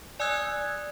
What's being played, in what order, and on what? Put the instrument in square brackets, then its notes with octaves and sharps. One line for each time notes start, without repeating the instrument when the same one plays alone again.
[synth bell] D5 G#5 D#6 E6 F#6 G#6